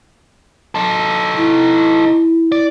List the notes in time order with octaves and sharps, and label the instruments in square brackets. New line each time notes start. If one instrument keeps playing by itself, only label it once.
[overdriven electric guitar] D#4 A4
[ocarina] E4
[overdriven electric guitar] D5